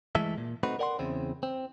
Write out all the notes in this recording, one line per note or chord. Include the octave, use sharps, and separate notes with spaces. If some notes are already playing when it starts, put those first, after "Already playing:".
E3 G#3 A3 A4 E5
A#2
A3 C4 D#4 F#4 B4
A#4 D5 F#5 G5 C6
E2 C#3 C4 E4
C4